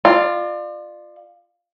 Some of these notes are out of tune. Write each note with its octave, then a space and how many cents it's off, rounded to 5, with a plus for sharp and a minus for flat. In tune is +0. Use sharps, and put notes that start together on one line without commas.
F4 +0 D5 +35